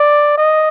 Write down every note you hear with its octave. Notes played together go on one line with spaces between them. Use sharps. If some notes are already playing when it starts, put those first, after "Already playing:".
Already playing: D5
D#5